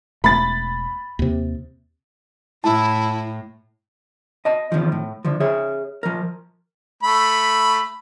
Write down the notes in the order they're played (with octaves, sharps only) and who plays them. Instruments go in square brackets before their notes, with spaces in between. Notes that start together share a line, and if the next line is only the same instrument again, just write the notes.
[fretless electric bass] E1 A3 [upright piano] B5 A6
[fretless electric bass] D#2 C3
[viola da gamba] A2 [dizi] E4 [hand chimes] A5
[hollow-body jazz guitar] D#5 A5
E2 A2 D#3 F3
A2
D3 F3
G#4 C#5 E5
F3 A#4
[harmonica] A3 B5